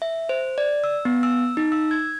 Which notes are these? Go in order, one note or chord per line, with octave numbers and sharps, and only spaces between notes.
E5
C5
D5
E6
B3
E6
D#4
E6
G#6